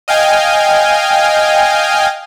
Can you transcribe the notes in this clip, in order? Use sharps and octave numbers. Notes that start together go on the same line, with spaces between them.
D#5 F5 G5 G#5